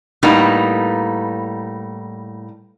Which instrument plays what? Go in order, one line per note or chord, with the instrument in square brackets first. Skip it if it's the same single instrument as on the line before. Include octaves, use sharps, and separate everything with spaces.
[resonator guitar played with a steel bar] A2 G3 A#3 B3 D#4